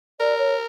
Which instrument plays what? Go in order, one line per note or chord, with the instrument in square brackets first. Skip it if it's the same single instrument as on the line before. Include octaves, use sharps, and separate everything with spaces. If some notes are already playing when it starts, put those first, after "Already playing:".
[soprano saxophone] A#4 [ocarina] D5
[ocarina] C#5